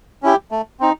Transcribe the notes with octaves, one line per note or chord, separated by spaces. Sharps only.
C#4 E4 G4
A3
C4 D#4